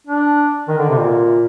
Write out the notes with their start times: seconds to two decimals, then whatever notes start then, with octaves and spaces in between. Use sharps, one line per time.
0.07 D4
0.68 D#3
0.78 D3
0.89 C3
0.99 A#2